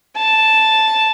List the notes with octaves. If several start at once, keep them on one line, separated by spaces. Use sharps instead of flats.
A5